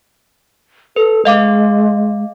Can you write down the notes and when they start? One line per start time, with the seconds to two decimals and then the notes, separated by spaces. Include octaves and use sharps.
0.96 A4 B4
1.25 G#3 D#5 F5 D6